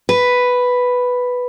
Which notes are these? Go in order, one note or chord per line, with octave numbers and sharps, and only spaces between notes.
B4